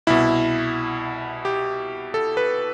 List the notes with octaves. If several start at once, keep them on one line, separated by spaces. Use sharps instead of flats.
C2 B2 E4
G4
A4
B4